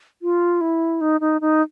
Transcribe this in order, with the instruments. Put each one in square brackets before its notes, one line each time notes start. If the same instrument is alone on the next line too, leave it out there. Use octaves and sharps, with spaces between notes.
[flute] F4
E4
D#4
D#4
D#4